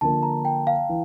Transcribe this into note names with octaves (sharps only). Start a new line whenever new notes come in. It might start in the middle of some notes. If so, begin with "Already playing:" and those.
D3 F3 A#3 A5
A#5
G5
F5
E3